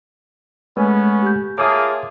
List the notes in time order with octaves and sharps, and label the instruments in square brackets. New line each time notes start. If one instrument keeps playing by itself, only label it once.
[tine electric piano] G#3 A3 G#5 [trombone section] B3 C#4 [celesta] B4
[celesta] G4 G6
[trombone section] A#3 F4 G#4 [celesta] C#5 E5 A5 [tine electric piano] D6 D#6